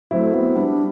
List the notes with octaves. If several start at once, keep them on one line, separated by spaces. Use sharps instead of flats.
F#3 A3 C4 E4
B3
G3 D4